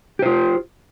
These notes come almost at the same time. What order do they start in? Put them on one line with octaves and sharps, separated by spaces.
G4 C5 F4